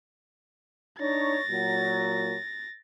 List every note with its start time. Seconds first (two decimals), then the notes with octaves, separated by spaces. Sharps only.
0.99 D4 D#4 C#5 A6 A#6
1.49 A#2 F#3